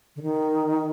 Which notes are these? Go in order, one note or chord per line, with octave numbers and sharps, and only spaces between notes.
D3
D#3